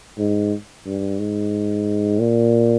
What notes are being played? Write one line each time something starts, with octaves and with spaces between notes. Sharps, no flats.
G#2
G2
G#2
A#2